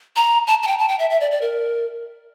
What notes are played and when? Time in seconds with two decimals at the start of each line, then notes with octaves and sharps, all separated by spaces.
0.16 A#5
0.47 A5
0.63 A5
0.67 G5
0.79 A5
0.89 G5
0.99 E5
1.10 E5
1.21 D5
1.31 D5
1.42 A#4